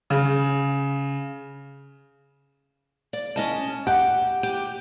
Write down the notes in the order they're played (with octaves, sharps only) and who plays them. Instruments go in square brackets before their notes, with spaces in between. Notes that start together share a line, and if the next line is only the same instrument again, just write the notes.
[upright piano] C#3
[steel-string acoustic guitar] D5
C#4 D#5 A5
[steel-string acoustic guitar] G4 [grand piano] F#5
[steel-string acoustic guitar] G4